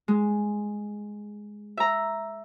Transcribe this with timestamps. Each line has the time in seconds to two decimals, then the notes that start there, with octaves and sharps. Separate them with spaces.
0.08 G#3
1.77 E5 A#5